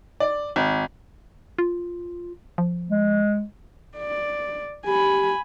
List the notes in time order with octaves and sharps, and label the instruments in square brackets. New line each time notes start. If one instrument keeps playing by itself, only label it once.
[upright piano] D5
G#1
[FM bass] F4
F3
[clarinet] G#3
[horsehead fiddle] D5
[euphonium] G4 [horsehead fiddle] G#5 B5